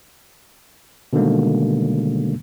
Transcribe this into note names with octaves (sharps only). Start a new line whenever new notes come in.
B2 D3 D#3 G3 G#3 A#3